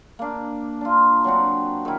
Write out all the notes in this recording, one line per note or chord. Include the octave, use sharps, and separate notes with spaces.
A#3 D4
D4 F4
F#3 C4 D4 F#4
D#3 E4